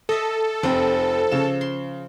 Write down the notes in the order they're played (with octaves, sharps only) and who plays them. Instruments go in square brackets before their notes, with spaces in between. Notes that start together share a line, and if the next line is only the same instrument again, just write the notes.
[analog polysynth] A4 [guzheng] D#5 E5
[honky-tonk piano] F1 C4 [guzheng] F3
[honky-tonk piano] C#3 E7
[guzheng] C6